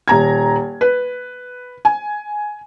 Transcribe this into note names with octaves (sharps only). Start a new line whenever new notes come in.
D#1 A#5 G#6
B4
G#5